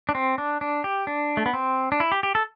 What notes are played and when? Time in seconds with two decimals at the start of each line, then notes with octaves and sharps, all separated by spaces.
0.09 D4
0.15 C4
0.38 D4
0.61 D4
0.84 G4
1.07 D4
1.37 A3
1.46 B3
1.54 C4
1.92 D4
2.00 E4
2.12 G4
2.23 G4
2.35 A4